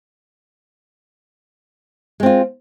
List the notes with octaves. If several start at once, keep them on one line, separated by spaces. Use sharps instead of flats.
G#3 C4 F4